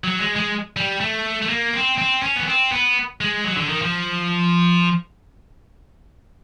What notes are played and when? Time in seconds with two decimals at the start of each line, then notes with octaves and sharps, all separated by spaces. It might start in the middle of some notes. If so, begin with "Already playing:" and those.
0.04 F#3
0.19 G#3
0.36 G#3
0.76 G3
1.00 A3
1.42 A3
1.49 A#3
1.74 C4
1.98 C4
2.22 C#4
2.36 B3
2.47 C4
2.72 B3
3.21 G#3
3.44 F#3
3.57 D3
3.69 D#3
3.82 F3